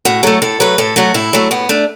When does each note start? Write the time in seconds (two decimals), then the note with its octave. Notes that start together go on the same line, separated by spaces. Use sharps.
0.05 A2 F#4
0.23 F#3 A3 A4
0.42 A2 A4
0.60 F#3 A3 B4
0.78 A2 A4
0.96 F#3 A3 F#4
1.14 A2 E4
1.33 F#3 A3
1.51 A2 B3
1.69 A3 D4